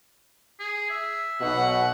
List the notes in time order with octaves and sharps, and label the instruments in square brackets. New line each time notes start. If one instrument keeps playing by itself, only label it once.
[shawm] G#4
E5
[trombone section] B1 B2 [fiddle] F#5